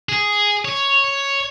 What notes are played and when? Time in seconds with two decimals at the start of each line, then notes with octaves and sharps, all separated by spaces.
0.09 G#4
0.65 C#5